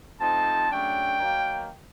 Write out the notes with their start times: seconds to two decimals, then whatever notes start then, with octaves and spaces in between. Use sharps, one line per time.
0.19 F3 A3 C4 D#4 A5
0.70 C#3 F#3 A3 D4 G5
1.19 D#3 F#3 A#3